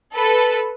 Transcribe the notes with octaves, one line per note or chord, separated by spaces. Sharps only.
A4 B4